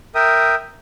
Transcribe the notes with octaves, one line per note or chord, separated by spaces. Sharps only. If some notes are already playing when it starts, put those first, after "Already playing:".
A#4 E5 G5 D#6